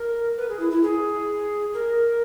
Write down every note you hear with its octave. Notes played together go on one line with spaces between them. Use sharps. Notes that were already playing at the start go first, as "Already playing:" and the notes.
Already playing: A#4
B4
G#4
E4
E4
G#4
A#4